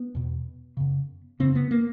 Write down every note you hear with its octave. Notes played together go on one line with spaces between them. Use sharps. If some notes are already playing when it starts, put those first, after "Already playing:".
Already playing: B3
E2 B2
F#2 C#3
F#2 C#3 C4
B3
A#3